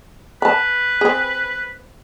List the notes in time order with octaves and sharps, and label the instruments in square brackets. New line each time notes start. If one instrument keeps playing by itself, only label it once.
[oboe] B4 [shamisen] A5 B5
[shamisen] C4 G#4